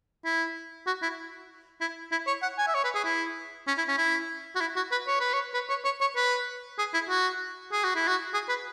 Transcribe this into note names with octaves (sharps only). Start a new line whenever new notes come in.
E4
F#4
E4
E4
E4
C#5
F#5
G#5
E5
C#5
B4
G#4
E4
C#4
E4
C#4
E4
F#4
E4
F#4
B4
C#5
B4
C#5
B4
C#5
C#5
C#5
B4
G#4
E4
F#4
G#4
F#4
E4
F#4
G#4
B4